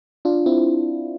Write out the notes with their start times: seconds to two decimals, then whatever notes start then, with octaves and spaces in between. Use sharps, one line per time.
0.25 D4 F4
0.46 C4 E4